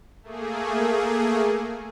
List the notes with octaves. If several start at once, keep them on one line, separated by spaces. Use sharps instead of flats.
A3 A#3 G#4